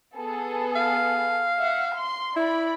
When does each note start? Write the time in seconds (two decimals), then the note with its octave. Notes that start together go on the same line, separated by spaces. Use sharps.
0.16 B3 G#4 A4
0.75 F5
1.58 E5 F#5
1.93 C6
2.36 E4 D5 B5